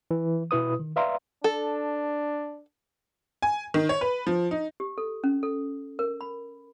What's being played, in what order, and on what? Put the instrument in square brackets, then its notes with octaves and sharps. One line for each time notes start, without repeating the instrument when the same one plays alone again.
[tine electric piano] E3
B2 E4 B4 D#6
D#3
B4 D5 E5 F5 A#5 C6
[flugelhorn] D4 [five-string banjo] A4
[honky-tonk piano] G#5
D#3
C#5
B4
F3
D#4
[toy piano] G4
A4
C#4
A4
A#4
B5